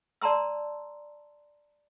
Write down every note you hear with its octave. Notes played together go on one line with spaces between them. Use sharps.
D5 A5 A#5 C6 E6